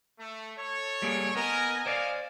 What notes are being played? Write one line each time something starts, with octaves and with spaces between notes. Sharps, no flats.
A3
A4 C#5
G3 A#3 G#4
B3 A#4 D#5 G#5
C5 D5 F5